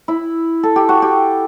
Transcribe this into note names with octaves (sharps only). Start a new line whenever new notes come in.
E4
A4
G4
F#4
G4